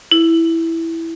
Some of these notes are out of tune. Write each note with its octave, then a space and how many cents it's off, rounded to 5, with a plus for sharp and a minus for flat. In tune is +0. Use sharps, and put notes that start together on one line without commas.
E4 +0